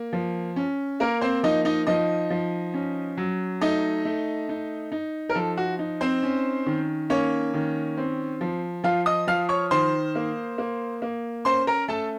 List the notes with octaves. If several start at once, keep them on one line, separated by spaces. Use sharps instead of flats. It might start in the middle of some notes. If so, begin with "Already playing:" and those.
Already playing: A#3
F3
C#4
A#3 A#4
C4 C5
F3 D#4 D#5
D#4 D#5
F3 D#4 D#5
F3
C#4
F#3
A3 D#4 D#5
A3
D#4
D#4
A#4
F3 A4
F#4
D#4
C4 C5
C#4
D#3
A#3 C#4 C#5
D#3
C4
F3
F3 F4 F5
D#5 D#6
F3 F5 F6
C#5 C#6
D#3 C5 C6
A#3
A#3
A#3
C#4 C5 C6
A#4 A#5
A3 A4 A5